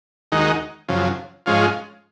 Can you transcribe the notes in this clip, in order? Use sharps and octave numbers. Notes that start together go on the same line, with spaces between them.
D#2 D#3 G#3 D#4 F#4
F#2 C#3 F3
G#2 F3 G#3 C#4 F4